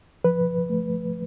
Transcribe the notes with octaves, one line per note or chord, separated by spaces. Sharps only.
F3 B4
A3